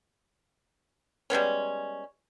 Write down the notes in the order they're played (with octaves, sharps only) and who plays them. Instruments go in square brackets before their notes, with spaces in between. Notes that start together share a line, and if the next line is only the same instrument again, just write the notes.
[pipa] G3 G#3 B3 C#4